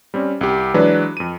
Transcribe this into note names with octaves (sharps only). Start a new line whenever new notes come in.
G3 C4 C#4
C2 G4
E3 F#3 G#3 D4 B4
F2 D#7